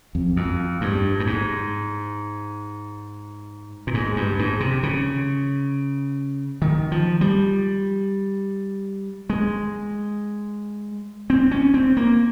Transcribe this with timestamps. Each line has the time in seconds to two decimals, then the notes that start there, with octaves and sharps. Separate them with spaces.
0.15 F2
0.37 F2
0.81 G2
1.20 G2
1.27 G#2
3.87 A#2
3.94 G#2
4.16 G2
4.39 G#2
4.60 C3
4.83 C#3
6.62 D#3
6.92 F3
7.21 G3
9.30 G#3
11.30 C4
11.51 C#4
11.74 C4
11.97 A#3